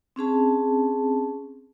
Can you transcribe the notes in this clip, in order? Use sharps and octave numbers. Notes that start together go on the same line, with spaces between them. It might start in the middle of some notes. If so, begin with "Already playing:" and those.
C4 C#4 G#4 A5